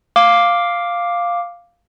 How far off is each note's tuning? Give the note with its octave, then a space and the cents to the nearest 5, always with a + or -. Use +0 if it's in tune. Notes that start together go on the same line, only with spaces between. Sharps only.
F5 +0 D6 +0